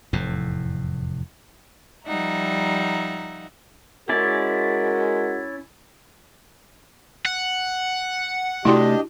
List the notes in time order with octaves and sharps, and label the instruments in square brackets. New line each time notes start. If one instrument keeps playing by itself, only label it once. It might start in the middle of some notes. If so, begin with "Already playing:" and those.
[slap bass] F1 E2 A2
[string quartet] F3 G3 D#4 E5 F#5 A#5
[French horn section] G#3 F#4 A#4 [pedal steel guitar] C#4 E4 D5
[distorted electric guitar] F#5
[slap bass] C3 A3 [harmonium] D4 G4 D#5 [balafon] E4 F#4 C6